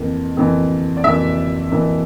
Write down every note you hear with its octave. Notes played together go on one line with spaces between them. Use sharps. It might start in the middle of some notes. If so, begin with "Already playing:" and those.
Already playing: F2 E3 A#3
F2 E3 A#3
D5
F2 E3 A#3 E5
F2 E3 A#3